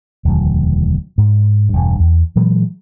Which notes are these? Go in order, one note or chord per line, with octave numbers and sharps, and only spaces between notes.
E1 D2 D#3 F#3
G#2
E1 G2
E2
A#2 E3 F#3 G#3